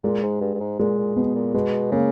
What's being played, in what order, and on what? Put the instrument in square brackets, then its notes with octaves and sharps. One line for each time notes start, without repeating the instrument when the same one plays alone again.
[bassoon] A#2 [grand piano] G#3
[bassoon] G#2
G2
G2
G#2
[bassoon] A#2 [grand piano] G#3
[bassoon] A#2
[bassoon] B2 [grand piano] B3
[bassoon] A#2
[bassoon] B2 [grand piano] G#3
[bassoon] C#3 [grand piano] A#3